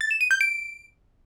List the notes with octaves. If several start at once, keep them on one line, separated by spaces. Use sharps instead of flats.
A6
E7
D#7
G6
D7